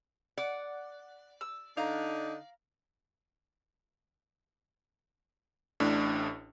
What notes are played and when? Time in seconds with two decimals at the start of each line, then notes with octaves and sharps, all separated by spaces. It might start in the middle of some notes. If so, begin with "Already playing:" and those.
0.38 D5 F#5
1.41 E6
1.77 D3 D4 D#4 F5 A#5
5.80 A1 A2 D4